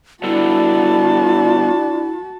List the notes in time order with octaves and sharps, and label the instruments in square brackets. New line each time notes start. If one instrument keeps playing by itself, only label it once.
[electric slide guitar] G3 B3 A4 [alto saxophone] D4 [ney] E4 [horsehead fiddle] F#4 A5